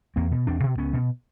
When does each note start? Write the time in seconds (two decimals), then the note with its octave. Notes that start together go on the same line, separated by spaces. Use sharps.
0.16 E2 A#3 C4
0.31 B2
0.47 E2 C4 D4
0.63 B2
0.78 C#2 B3 C#4
0.93 B2